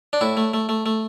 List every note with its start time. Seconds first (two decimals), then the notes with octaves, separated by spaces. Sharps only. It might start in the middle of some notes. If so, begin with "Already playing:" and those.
0.13 D4
0.21 A2 E4
0.37 A3
0.54 A3
0.69 A3
0.86 A3